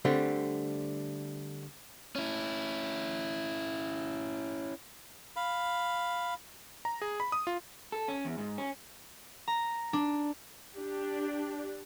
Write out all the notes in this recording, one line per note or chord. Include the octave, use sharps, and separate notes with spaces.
D3 G3 A3 C4
C#4 E4
F5 B5
A#5
G#4
B5
D#6
F4
A4
C#4
E2
G#2
C#4
A#5
D4
D4 G4